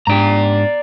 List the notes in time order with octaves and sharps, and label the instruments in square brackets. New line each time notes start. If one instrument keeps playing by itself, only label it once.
[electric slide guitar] G#2 D4 G4 [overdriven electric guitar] D5 A#5